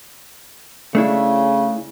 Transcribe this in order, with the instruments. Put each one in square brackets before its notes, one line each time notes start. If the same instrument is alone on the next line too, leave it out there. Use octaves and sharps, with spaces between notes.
[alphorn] C#3 [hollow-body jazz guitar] A3 D4 E4